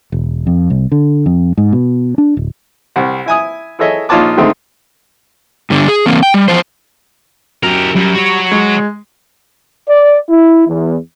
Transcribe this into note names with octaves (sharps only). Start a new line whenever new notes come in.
E1
F2
C2
D3
F2
G#2
B2
D4
D1
C2 F#5
E4 G#5 D#6
E4 G#4 A4 C#5 D#5 E5
A#1 D#4 F4 C#5 A5 D6
D3 D#3 G#3 A3 C4 D#4
G2 D3
G#4
E3 A#3 C4
G5
G3
E2 F3 C5
F#2 G4 A#4
F#2 G3
F#4 C#5
G#3
D5
E4
E2